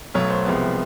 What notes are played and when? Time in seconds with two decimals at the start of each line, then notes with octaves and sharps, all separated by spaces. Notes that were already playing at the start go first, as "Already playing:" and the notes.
0.14 B1 B2 F#3 A3 C#5
0.30 C5
0.45 C2 C3 F3 G#3 B3